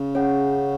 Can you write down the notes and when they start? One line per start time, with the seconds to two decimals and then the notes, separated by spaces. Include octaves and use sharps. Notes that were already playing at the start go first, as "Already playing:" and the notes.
Already playing: C#3
0.15 C#4 G#4 C#5 F#5